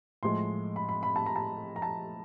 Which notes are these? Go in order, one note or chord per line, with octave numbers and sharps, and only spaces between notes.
A2 F3 G#3 C6
B5
B5
B5
A5
A#5
A5
A#5
A5